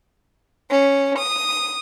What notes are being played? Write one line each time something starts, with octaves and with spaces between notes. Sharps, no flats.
C#4
D#6